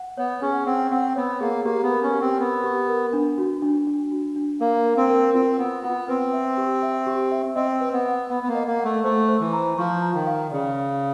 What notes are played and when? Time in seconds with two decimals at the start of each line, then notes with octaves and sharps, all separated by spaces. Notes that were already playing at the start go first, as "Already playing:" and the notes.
Already playing: F#5
0.18 B3 C#5
0.42 C#4 G#4
0.66 C4 F#5
0.91 C4 F#5
1.16 B3 C#5
1.41 A#3 G#4
1.65 A#3 G4
1.83 B3
1.90 A#4
2.03 C#4
2.14 G4
2.21 C4
2.39 B3 A#4
2.64 G4
2.88 A#4
3.13 D4
3.38 F#4
3.62 D4
3.87 D4
4.11 F#4
4.36 D4
4.61 A#3 A#4
4.85 A#4
4.97 C4
5.10 A#4
5.34 C4 F4
5.59 B3 F4
5.83 B3 F4
6.08 C4 B4
6.33 E5
6.57 G4
6.82 E5
7.06 G4
7.32 E5
7.56 C4 D#5
7.81 B4
7.93 B3
8.06 F#5
8.30 B3 F#5
8.44 B3
8.48 A#3
8.55 D#5
8.67 A#3
8.79 F#5
8.85 A3
9.04 A3 C5
9.29 C5
9.40 E3
9.53 A#5
9.78 F3 C#6
10.02 A#5
10.14 D#3
10.27 F5
10.52 C#3 D5
10.77 F5